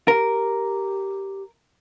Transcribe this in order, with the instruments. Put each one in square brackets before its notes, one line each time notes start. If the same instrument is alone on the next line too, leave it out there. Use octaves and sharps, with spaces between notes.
[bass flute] G4 [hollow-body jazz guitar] A#4